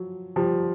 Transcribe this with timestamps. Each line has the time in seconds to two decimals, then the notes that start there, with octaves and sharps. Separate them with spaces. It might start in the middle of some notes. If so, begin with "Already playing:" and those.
Already playing: F3 F#3
0.36 F3 G3